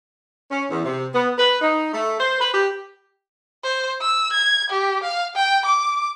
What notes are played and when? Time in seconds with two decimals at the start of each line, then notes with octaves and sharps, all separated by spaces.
0.51 C#4
0.70 E2
0.85 C3
1.14 B3
1.38 B4
1.61 D#4
1.94 A3
2.20 C5
2.40 B4
2.54 G4
3.64 C5
4.01 E6
4.33 G#6
4.70 G4
5.03 F5
5.36 G5
5.65 D6